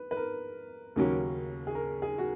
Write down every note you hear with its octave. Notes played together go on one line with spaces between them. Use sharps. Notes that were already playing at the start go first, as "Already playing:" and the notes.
Already playing: B4
B4
A#4
D#2 C#3 F#3 A#3 C#4
G#4
A#4
G#4
F#4